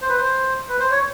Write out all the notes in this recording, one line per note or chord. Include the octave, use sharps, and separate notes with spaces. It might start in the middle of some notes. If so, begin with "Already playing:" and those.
C5
B4
C5
B4
C5
C#5